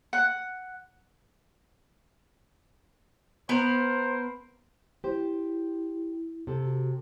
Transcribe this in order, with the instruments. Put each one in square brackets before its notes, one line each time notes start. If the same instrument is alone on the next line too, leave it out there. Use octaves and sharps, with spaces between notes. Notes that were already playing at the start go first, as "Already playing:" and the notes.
[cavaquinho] F#5
[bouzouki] B3 A#4 [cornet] C5
[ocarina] E4 [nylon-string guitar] G4 C5
[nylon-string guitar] C3 A4
[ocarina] F#4